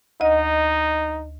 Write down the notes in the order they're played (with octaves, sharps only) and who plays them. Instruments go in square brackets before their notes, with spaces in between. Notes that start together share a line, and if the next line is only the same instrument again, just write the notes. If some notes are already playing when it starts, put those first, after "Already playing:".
[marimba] D2 D#5 [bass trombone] D#4